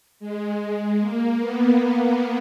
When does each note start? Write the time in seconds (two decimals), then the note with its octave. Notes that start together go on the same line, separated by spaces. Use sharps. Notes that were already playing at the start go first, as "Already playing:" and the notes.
0.20 G#3
1.00 A#3
1.40 B3